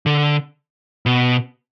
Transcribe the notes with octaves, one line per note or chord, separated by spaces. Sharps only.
D3
B2